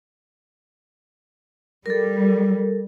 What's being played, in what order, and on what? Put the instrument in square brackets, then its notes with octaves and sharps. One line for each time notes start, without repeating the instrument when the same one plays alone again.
[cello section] G3 [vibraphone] A4 A#4